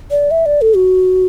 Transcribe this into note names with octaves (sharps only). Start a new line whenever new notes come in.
D5
E5
D5
A4
F#4